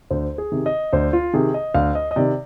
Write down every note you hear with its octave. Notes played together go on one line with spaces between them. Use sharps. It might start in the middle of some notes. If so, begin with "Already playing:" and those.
D2 C5
G#4
C3 D#3
D#5
D2 C5
F4
C3 D#3 G#4
D#5
D2 F5
D#5
D#5
C3 D#3 D5